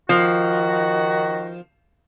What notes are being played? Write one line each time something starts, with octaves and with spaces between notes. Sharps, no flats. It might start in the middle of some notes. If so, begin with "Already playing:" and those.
D#3 F3 F#4